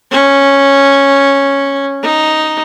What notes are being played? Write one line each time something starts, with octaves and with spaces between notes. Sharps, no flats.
C#4
D#4